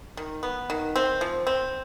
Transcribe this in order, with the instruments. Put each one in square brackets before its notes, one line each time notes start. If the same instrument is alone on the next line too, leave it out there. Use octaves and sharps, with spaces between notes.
[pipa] D#3
B3
D#3
C4
F3
C4